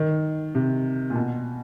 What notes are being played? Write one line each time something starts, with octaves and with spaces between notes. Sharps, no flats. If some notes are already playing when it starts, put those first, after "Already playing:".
Already playing: D#3
C3
A#2
B2